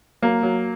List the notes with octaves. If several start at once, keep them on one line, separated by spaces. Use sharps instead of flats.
F#3 A#3
F#3